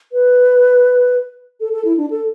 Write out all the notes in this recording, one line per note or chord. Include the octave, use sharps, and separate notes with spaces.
B4
A4
A4
E4
D4
A4